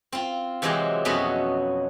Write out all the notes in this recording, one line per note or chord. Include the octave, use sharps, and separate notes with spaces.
C4 F4
C3 E3 F#3 G#3 C4 D#5
F2 B2 F#3 B3 C#4 D#5